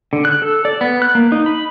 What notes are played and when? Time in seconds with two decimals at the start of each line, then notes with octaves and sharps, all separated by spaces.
0.13 D3
0.25 F#6
0.42 A4
0.65 D5
0.81 B3
1.02 F#6
1.15 A#3
1.32 D#4
1.46 B5